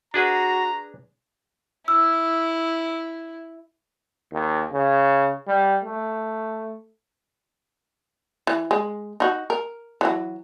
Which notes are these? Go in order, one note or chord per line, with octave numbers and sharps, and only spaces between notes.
D4 F#4 G#4 B4 A#5
E4 E6
D#2
C#3
G3
A3
E3
G#3
D#4 F#4
A#4
E3 F#3